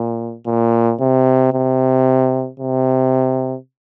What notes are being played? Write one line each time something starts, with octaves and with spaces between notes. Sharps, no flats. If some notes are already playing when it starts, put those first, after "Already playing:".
Already playing: A#2
A#2
C3
C3
C3